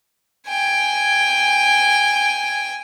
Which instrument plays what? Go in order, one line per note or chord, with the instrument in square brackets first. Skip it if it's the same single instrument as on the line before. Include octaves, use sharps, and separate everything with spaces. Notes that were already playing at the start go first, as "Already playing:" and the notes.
[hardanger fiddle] G5 G#5